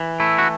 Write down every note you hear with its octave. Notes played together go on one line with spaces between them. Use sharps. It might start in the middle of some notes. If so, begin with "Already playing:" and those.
Already playing: E3
A3 E4
F#4